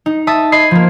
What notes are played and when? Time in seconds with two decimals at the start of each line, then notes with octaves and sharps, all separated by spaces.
0.06 D#4
0.27 E5 A5 D#6 A#6 B6
0.52 D#5 B5 D#6 G#6 C7
0.71 F3 A#3